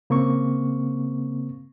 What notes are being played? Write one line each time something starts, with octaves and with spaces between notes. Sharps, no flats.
C#3 A#3 C4 C#6